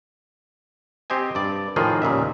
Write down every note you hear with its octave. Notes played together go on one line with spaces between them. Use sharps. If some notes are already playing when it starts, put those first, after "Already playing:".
C4 G4 C5 D#5 G#5
G2 D5
A2 D#3 F3 F4 F#4 G#4
D#2 A#2 C#3 E5